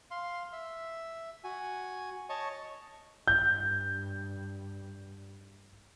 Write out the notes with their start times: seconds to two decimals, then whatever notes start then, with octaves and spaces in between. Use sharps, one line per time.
0.11 F5 C6
0.53 E5
1.44 F#4 G#5
2.29 C#5 D#5 A5 C#6
3.28 G2 G6